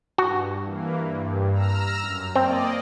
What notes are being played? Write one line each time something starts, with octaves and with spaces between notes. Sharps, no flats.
G2 F#4
E3 A#3
G2
A#5 E6 F6
F#2
A#3 C4 D5 D#5